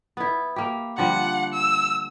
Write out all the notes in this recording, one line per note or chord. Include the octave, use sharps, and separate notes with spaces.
B3 E4
A#3 G4
D3 F3 G3 F#5
E6